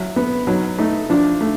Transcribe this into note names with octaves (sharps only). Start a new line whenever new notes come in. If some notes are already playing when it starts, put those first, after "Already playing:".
Already playing: F#3 E4
B3
F#3 D#4
A3 D#4
F3 D4
A3